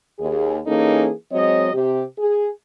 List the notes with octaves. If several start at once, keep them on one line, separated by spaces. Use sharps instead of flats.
D#2 G#4
E3 A#3 C#4 D#4 G#4 A4
F#3 G#3 C4 C#5 D#5
C3 G4
G#4